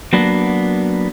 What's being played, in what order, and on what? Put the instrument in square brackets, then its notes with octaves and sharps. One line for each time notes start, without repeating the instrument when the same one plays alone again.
[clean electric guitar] F#3 A#3 B3 D4